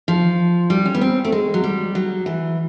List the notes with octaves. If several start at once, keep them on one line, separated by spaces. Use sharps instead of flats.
F3
G3
C#4
B3
C4
A3
G#3
F#3
G3
F#3
E3